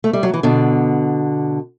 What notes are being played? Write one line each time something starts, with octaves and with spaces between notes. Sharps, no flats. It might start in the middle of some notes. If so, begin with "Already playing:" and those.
A3
G3
F#3
E3
B2 D3